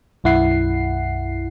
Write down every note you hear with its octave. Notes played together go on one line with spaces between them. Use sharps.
B1 F#2 E4 F#5 C7